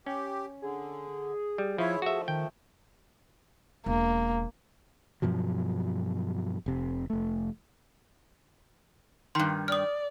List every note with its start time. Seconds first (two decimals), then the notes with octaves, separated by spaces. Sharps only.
0.06 C#4 G4
0.62 D3 G#4
1.58 G3
1.78 F3 E4 C#5 E5
2.02 F3 A3 F#4 E5
2.28 D#3 G5
3.86 E1 A#3
5.22 G2 B2 F3 F#3
6.66 F1 C3
7.10 F1 A3
9.35 G2 D#3 C6
9.68 D5 D#6 F6